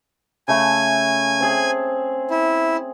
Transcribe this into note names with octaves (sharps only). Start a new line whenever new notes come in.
C#3 A3 E5 G#5
C4 G#4
E4